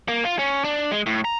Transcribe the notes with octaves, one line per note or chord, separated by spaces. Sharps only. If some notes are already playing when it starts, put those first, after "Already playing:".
A#3
F4
C#4
D4
G#3
A2
A#5